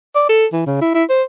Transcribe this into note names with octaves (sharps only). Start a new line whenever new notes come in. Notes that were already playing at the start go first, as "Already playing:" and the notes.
D5
A4
E3
C#3
E4
E4
C5